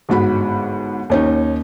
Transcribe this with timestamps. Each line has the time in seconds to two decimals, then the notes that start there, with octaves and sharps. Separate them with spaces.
0.09 G1 G#2 F#4 B5
1.10 D#2 C#4 D#4